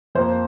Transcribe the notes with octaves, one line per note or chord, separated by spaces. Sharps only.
F2 F3 A#3 C5